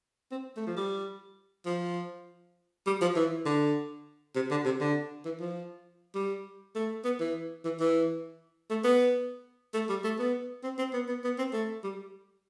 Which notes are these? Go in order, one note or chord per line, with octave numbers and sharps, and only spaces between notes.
C4
A3
F3
G3
F3
G3
F3
E3
D3
C3
D3
C3
D3
E3
F3
G3
A3
B3
E3
E3
E3
A3
B3
A3
G3
A3
B3
C4
C4
B3
B3
B3
C4
A3
G3